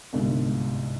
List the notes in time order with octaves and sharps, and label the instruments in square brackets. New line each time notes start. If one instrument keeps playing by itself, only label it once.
[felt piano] G1 C2 G#2